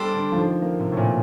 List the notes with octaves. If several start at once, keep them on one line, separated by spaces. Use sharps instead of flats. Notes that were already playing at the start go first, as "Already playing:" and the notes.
Already playing: G3 D4 A4 C5
D3
F3
D#3
A#3
C3
A2
A#2